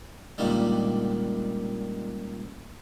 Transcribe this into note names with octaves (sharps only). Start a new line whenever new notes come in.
C#2 A#2 D3 D#3 G3